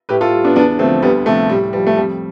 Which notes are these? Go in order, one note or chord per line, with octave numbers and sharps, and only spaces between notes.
A2 G4 B4
F4 A4
G3
B3 D4
E2 B3 D4
D3 F3 A3 C4
D2 G3 B3
C3 F3 A3
A2 G3
F3 G3
A3
F2 G3